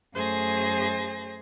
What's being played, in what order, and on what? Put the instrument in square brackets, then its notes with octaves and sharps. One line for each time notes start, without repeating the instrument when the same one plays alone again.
[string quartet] F#2 A3 G#4 C5 G#5 A#6